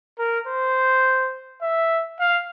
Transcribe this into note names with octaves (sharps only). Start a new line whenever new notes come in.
A#4
C5
E5
F5